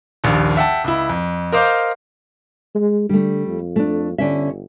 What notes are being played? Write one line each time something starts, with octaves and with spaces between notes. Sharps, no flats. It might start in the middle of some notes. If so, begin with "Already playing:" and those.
D#1 A#1 D#2
E5 F#5 G5 A5
C#2 E4
F2
A#4 C5 D#5 F5 D6 G6
G#3
D3 G3 A3
F2
A3 D4
G1 D3 C#4 E5